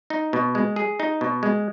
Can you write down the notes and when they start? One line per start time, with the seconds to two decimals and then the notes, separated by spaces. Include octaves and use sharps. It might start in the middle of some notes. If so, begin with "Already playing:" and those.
0.10 D#4
0.33 B2
0.55 G#3
0.76 G#4
1.00 D#4
1.21 B2
1.43 G#3